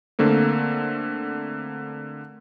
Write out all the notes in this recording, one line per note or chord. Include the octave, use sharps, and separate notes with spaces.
D3 A3 A#3 C4